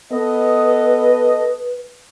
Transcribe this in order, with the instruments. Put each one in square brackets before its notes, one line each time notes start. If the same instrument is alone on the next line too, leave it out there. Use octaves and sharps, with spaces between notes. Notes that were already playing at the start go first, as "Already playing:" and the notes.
[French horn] B3 [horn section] A4 D#5 [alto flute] B4